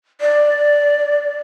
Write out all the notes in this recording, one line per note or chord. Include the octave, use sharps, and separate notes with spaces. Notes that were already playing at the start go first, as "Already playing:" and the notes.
D5